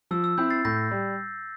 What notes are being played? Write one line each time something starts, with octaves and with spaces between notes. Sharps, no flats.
F3 E6
E6
C4 E4 G6
A6 C7
A2 G6 A#6
G3